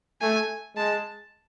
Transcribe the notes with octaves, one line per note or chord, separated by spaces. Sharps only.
A3 G#5
G#3 A5